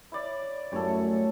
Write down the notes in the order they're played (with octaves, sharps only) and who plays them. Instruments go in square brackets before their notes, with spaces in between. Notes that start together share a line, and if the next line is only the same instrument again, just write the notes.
[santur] E4 C#5 D5
[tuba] F#2 [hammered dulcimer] A2 G3 C#4 [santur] A4 C#5